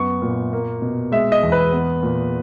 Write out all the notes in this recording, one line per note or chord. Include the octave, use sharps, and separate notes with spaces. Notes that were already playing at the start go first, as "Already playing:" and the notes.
Already playing: F#2 B3 C#6
A#2
A#3
B2
G#3 E5
D#5
E2
B4
B3
A#2